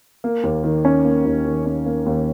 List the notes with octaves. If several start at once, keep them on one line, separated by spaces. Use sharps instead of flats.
A#3
D#2
D#3
C#4
A#3
D#2
D#3
C#4
A#3
D#2